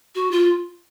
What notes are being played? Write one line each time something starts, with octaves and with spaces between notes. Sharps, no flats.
F#4
F4